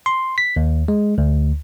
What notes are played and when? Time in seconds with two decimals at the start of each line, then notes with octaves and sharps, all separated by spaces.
0.06 C6
0.38 B6
0.56 D#2
0.88 G#3
1.18 D2